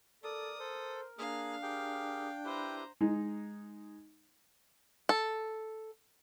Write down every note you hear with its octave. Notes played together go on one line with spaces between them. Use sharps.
A4 A#4 D5 D#6
A4 C5
A#3 D4 G#4 F5 F6
G4 G#4 A#4 G5
E4 G4 B4 C5 A#5
G#3 D#4
A4